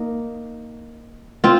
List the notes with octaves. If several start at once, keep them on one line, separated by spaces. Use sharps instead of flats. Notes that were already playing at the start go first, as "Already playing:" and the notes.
Already playing: A#3 D#4
C4 F4